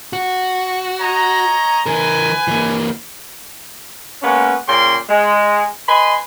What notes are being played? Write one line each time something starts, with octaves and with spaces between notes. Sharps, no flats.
F#4
C#5 D#5 A#5
E3 A#4 B4 G#5
E3 A#3
G#3 A#3 B3 C#4
A#2 C#3 C#4 G5 C6
G#3
B4 D#5 G#5 B5 C6